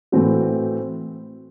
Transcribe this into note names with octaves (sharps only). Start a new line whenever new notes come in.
A2 E3 C4 F#4